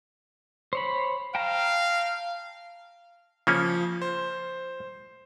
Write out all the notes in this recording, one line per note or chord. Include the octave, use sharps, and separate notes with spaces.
C5 C#5 B5
F5 G5 A5 A#5
C#3 F3 A#3 C#4
C5